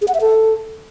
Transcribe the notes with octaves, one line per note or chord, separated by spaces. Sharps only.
G#4
F#5
E5
A4